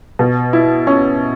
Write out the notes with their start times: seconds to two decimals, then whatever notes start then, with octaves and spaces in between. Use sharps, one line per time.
0.19 B2
0.53 E4
0.87 C#4